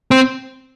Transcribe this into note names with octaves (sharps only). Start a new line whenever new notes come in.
C4